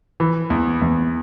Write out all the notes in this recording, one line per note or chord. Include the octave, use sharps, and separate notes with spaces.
E3
E2
E2